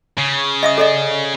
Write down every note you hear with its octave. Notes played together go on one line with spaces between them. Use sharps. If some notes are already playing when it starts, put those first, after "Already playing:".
C#3
D#5 E5 D#6
A4 D5 D#5